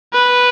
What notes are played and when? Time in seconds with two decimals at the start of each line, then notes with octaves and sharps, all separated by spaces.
0.13 B4